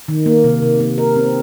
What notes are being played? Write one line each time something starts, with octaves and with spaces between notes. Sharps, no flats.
D#3
A#3
C3
C3
A#3
A#4
C4